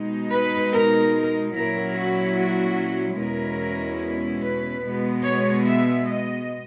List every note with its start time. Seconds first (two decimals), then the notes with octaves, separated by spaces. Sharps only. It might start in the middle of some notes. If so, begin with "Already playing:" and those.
Already playing: B2 G#3 D#4
0.32 B4
0.73 A#4
1.55 A#2 F#3 C#4 E4 A#4
1.96 F#4
2.37 F#4
3.18 E2 B2 G#3 C#4 E4 A#4
4.42 B4
4.83 B2 G#3 B3
5.24 C#5
5.64 E5
6.06 D#5